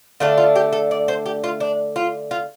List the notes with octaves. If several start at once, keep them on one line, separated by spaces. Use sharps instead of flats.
D3 A3 D4 F4
F4
G4
A4
D5
C5
G4
F4
D4
F4
F4